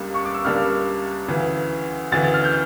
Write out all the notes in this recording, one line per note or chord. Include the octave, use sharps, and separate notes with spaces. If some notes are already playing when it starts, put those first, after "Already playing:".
Already playing: C#2 C#3 G3 A#3 D4
C#6
D6
E6
C#2 C#3 G3 A#3 D4 F6
D2 C#3 E3
D2 C#3 E3 A6
F6
G6